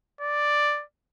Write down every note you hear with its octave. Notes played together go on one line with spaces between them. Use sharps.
D5